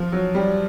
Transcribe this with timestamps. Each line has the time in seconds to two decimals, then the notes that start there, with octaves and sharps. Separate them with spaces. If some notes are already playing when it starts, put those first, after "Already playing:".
Already playing: F3
0.12 F#3
0.35 G3